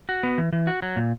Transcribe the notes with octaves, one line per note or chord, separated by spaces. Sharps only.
F#4
B3
E3
E3
F#4
F#3
A#2